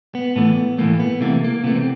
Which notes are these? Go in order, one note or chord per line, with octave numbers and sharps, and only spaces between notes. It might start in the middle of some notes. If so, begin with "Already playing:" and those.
B3
A2 E3 A3 B3
A2 E3 A3 A#3
B3
C3 E3 A3 A#3
A#3
C3 E3 A3 B3
C4